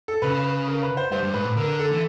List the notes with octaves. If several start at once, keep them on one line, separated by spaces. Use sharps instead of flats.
A4
C#3 B4
B4
A#4
B4
C5
G2 C5
G2
G#2 B4
A2
D3 A#4
A4
E3